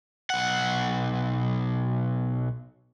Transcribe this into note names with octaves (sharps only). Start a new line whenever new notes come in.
B1 F#5